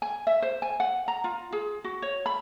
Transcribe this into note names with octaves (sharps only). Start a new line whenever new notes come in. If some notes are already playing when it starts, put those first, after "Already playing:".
G#5
E5
C5
G#5
F#5
A#5
F4
G#4
F#4
C#5
B5